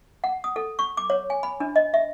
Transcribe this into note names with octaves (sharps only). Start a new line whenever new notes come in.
F#5
D#6
A4
C#6
D6
C#5
G#5
B5
D4
D#5
E5